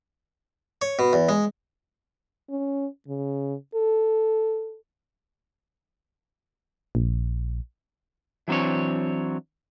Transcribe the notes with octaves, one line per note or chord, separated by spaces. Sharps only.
C#5
B2
E2
G#3
C#4
C#3
A4
A#1
E3 F#3 C4 D4 C#5